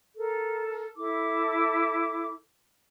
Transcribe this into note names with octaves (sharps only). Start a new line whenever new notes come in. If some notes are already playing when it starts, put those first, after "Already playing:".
A4 A#4
E4 A4 D6